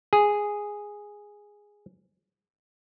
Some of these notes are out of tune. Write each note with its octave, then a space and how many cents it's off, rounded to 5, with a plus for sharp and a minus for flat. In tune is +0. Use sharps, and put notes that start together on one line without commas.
G#4 -5